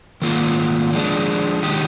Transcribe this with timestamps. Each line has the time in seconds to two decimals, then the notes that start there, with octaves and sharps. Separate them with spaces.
0.22 G#2 D#3 A#3 F4
0.93 F3 G#3 D4
1.63 D#3 G#3 D#4 G4